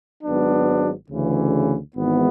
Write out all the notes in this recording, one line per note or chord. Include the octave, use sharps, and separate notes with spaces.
G#1 G#2 F#3 B3 D4
D2 C#3 E3
G#1 G#2 E3 B3